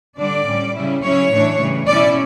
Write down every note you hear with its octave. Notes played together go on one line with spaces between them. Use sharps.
D3 G3 D4 D5
A2 G3 C#4
C#3 G3 C#4 E4
C#3 F#3 C#4 E4 C#5
A2 E3 A3 D4
C#3 E3 G3
B2 A3 C#4 E4 D5